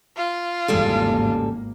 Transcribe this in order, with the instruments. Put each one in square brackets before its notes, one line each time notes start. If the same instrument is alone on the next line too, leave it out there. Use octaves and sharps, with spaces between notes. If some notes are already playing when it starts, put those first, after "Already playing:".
[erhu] F4
[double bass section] G#1 E2 A#3 [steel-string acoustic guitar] C#3 G3 A4